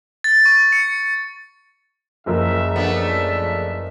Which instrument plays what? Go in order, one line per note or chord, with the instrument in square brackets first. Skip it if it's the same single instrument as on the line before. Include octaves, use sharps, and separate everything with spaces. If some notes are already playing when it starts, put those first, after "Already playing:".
[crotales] A6
C#6
C#7
[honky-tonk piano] F#1 F3 A#4 [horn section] C#3 E5
[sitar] A3 B3 D4